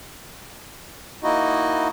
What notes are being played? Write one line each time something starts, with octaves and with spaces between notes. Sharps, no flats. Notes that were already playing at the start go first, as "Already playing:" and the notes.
A#3 D#4 E4 F#4 D#5